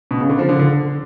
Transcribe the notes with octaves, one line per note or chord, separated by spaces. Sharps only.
B2
C#3
D3
F3
D3
D3